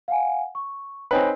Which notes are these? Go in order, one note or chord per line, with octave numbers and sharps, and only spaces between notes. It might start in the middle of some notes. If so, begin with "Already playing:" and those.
F5 F#5 G#5
C#6
C4 D#4 B4 C#5 G5 G#5